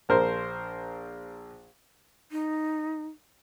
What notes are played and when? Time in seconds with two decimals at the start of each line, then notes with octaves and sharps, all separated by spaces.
0.09 A#1 A#4 C5
2.32 D#4